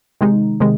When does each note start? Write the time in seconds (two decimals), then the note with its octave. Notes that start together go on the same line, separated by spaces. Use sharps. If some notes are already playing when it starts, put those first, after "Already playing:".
0.21 C3 D#3 G#3 D#4
0.60 C3 D#3 G#3